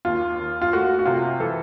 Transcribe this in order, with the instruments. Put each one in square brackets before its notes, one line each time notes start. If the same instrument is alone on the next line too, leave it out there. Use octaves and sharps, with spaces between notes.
[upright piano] D#2 F4
D#2
F4
A3 F#4
F#4
C3 F4
E3 A4